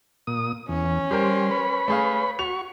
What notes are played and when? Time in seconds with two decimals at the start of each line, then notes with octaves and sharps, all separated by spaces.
0.27 A#2 D#6
0.69 E2 C#4
1.11 G3 G4 A#4 C5 C6
1.51 B4 C#5 B5
1.88 A3 G#4 F5
2.39 F#4 C#6 F7